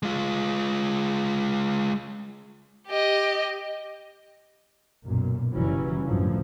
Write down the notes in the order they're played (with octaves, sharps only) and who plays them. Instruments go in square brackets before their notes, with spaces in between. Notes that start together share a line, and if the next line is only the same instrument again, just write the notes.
[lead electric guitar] G#3 F4
[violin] G4 D#5
[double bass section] B1 F#2 A#2
F#1 E3 F#3 G3 C#4
B1 F#2 A2 D3 F3